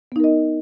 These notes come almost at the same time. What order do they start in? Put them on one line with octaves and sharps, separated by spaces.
B3 D#4 A#4 D#5